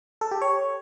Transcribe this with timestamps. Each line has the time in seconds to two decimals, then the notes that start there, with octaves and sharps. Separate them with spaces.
0.21 A4
0.31 G4
0.41 C#5